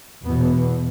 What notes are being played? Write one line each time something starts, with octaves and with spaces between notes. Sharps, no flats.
E2 B2 B3